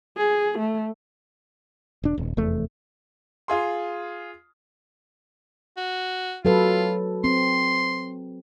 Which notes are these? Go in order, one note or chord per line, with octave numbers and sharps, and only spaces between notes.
G#4
A3
E1 D4
D#1
F1 E2 A3
F4 G#4 C6
F#4
F#3 F4 A4 B4
C4 C6